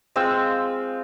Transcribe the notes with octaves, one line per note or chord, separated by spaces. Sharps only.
G#3 C4 F4 E6